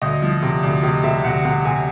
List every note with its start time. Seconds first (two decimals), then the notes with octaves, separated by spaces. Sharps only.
0.02 D2 D#5
0.22 F3
0.42 C3
0.63 D2
0.83 C3 D#5
1.04 C3 E5
1.24 D2 F#5
1.45 C3 F#5
1.65 C3 G#5